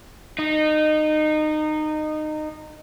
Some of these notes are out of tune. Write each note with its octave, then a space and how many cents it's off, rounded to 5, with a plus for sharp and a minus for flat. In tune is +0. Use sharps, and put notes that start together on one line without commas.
D#4 -20